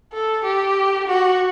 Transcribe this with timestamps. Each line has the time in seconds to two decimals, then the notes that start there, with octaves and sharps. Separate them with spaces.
0.13 A4
0.44 G4
1.08 F#4